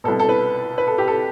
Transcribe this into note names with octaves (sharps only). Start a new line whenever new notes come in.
C2 B2 A4
A4
B4
B4
A4
G4
A4